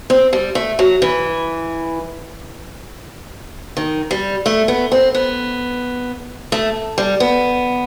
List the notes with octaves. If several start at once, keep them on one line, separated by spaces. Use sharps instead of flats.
C4
G3
A3
F#3
E3
D#3
G3
A3
B3
C4
B3
A3
G3
B3